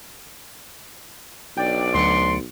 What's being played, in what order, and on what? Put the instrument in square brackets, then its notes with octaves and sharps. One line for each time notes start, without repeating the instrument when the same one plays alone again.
[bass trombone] B1 [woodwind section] D4 D5 [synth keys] G5
[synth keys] D2 F#3 C#7 [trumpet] C6